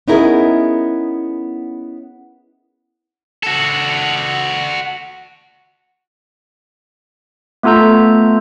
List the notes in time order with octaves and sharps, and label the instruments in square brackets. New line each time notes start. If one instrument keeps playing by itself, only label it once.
[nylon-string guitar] B3 C#4 D#4 E4 G#4 A#4
[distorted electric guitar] F#4 A4
[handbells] A3 B3 F4 A4 A#5 G6